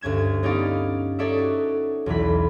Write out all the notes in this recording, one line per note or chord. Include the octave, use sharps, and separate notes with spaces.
D2 G2 C#4 G#6 E7
B3 C#4 D#4 G4 D5 F5
D#4 A4 C#5 D5 E5
F#4
B1 E2 E3 B5